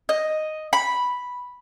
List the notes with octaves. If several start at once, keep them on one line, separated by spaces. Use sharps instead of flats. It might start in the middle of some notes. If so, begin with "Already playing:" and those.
D#5
B5